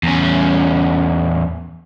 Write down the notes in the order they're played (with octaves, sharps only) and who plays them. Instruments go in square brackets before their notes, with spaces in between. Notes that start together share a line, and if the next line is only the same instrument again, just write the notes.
[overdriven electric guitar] E2 C#4